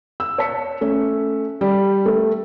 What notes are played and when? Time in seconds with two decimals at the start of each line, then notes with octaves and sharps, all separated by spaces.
0.20 E6
0.38 C#5 A5 B6 C#7
0.81 A3 C#4
1.61 G3
2.06 A3 A4